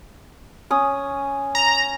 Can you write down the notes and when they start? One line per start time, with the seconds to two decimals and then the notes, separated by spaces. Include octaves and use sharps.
0.71 C#4 D#6
1.55 A#5